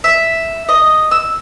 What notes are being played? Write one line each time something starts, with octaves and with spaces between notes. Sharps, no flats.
E5
D#5
E6